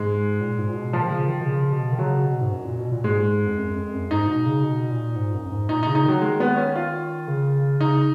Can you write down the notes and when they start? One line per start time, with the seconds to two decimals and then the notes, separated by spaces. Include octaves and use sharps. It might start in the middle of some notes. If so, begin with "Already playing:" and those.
Already playing: G#2 G#3
0.41 A#2
0.59 G#2
0.69 A#2
0.76 B2
0.93 A#2 F3
1.02 D#3
1.11 C#3
1.28 D#3
1.40 B2
1.46 C#3
1.73 B2
1.92 D#3
1.99 C#3 F#3
2.26 B2
2.41 G#2
2.52 F#2
2.65 A#2
2.79 B2
2.92 A#2
3.04 G#2 G#3
3.47 F2
3.57 F#2
3.70 F#2
3.75 F2
3.93 F#2
4.11 G#2 D#4
4.28 B2
4.46 C#3
4.64 B2
4.90 A#2
5.16 G#2
5.34 F#2
5.46 F#2
5.52 G#2
5.69 A#2 D#4
5.83 D#4
5.87 C#3
5.95 D#4
6.05 D#3 F#3
6.21 G#3
6.40 B3
6.57 C#4
6.76 F4
7.28 C#3
7.80 C#3 D#4